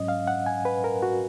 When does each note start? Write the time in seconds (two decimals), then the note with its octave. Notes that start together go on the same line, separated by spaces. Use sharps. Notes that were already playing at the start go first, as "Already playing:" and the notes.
Already playing: G#2 F#3 C#4 D#5
0.08 F5
0.27 F#5
0.46 G#5
0.65 B4
0.84 A#4
1.03 F#4